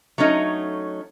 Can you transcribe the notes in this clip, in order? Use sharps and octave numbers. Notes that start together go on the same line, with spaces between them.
F#3 A3 C#4 D#4